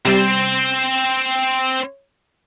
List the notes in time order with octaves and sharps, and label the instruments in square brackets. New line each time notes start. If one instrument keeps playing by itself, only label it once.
[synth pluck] C3 G3 A6 [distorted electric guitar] C4 C5